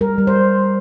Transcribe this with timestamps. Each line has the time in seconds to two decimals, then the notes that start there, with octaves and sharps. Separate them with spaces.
0.01 G3 A#4
0.18 G3
0.27 C5